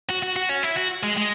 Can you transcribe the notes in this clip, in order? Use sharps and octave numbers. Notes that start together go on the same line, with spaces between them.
F#4
F#4
F#4
C#4
E4
F#4
G#3
G#3